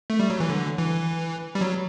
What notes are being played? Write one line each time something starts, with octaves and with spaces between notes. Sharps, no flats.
A3
G3
F#3
E3
D3
E3
G3
F#3